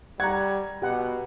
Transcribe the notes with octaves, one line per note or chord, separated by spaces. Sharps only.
G3 F#5 A#5 G#6
B2 G4 F#5